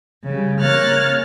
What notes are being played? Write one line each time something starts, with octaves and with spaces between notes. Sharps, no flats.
C#3 G3
C#3 A#3 C#5 F6 F#6 A6